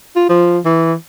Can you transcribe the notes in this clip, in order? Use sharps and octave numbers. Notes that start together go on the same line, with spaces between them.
F4
F3
E3